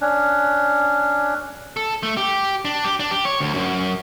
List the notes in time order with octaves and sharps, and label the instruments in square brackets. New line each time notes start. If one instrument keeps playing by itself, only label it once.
[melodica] C#4 D4
[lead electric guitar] A4
A3
G4
D4
G4
D4
G4
C#5
D2
F#2